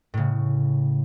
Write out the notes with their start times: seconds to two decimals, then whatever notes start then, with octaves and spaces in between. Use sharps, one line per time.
0.14 A2 C#3